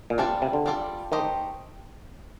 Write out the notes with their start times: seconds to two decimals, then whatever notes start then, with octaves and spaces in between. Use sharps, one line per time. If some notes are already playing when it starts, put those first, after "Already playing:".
0.10 A#2
0.18 C3 G3 D4 F4 A4 D5
0.42 C3
0.53 D3
0.66 G3 D4 F4 A4 D5
1.12 D#3 A3 D#4 G4 C5 D#5